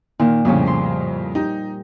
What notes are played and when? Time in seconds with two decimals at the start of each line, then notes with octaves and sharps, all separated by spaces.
0.20 A#2 D#3
0.45 F2 A2 C#3 F3 G3 C#4
0.66 A#2 C6
1.35 D#4 G4